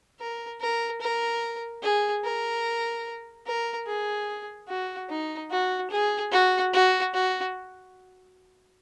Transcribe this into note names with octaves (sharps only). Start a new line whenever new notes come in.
A#4
A#4
A#4
G#4
A#4
A#4
G#4
F#4
D#4
F#4
G#4
F#4
F#4
F#4